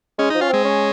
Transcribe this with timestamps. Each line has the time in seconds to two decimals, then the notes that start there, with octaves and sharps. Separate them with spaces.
0.18 G#3 C#4
0.30 F3 D#4
0.41 C#4 F4
0.49 G#3 C4
0.65 C#4